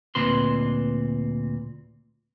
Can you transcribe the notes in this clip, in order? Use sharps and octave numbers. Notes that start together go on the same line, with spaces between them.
D2 A#2 C4 B4 C6